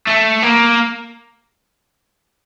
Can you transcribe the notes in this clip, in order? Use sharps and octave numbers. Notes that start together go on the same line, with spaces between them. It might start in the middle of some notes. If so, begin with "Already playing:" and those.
A3
A#3